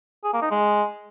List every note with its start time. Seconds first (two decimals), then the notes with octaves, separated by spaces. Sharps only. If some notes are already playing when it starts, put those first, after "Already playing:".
0.24 G#4
0.33 A#3
0.42 D#4
0.51 G#3